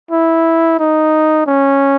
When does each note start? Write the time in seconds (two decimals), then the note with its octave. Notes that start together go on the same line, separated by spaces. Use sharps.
0.11 E4
0.79 D#4
1.47 C#4